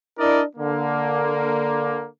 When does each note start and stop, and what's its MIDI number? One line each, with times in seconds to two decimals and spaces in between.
0.18 0.41 62
0.18 0.41 64
0.18 0.41 70
0.18 0.41 74
0.18 0.41 75
0.56 2.06 50
0.56 2.06 58